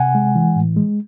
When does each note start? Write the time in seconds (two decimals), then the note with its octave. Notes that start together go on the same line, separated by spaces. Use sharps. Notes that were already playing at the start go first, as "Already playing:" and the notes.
Already playing: C3 F#5 G#5
0.15 G#3
0.35 E3
0.56 A2
0.77 G#3